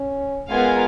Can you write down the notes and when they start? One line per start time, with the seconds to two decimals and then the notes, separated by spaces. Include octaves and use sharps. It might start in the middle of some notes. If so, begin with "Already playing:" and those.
Already playing: C#4
0.50 G#3 B3 F4 A#4 F5 G#5